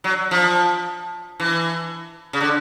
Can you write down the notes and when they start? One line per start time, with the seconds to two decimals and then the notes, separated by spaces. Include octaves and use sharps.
0.04 F#3
0.31 F3
1.40 E3
2.33 C#3
2.40 D3